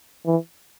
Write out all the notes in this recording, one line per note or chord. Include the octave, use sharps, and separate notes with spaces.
E3